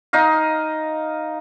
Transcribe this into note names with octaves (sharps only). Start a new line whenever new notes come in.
D#4 D#5 F5